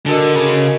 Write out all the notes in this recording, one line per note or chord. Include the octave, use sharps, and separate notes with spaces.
D3 D4 F#4 A#4 D#5
C#3